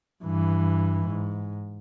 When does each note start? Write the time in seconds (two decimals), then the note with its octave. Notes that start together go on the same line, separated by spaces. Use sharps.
0.24 G2 E3
1.07 G#2